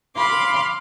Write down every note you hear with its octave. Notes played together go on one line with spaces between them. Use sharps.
F5 B5 C6 D6